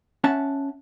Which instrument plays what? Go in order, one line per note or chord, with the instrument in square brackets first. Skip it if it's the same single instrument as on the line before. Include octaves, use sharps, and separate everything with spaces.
[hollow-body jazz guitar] C#4 E5 F#5 A5